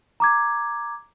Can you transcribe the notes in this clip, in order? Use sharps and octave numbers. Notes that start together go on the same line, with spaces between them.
A#5 D6 G#6